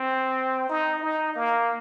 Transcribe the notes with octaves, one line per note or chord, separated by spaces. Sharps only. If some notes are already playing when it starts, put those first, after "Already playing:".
Already playing: C4
D#4
D#4
A#3